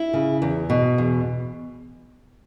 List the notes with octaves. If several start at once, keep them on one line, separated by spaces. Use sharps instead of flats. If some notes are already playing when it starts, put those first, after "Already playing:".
Already playing: E4
C#3
E2
B2
E2